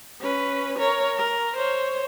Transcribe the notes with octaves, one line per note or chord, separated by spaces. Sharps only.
C#4 B4
A#4 C#5
A#4
C5 C#5